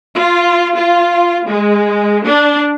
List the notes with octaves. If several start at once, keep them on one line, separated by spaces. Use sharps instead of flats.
F4
F4
G#3
D4